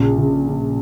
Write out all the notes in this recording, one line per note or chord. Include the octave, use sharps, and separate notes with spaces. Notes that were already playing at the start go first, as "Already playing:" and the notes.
Already playing: A#1 C#3
C#3
C#3